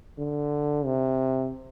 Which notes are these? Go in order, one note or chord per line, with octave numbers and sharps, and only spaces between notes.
D3
C3